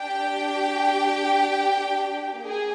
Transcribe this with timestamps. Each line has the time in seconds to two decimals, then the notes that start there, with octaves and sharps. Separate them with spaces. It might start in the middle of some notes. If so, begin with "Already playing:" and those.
Already playing: D4 G4 G5
2.43 A#3 G#4 G#5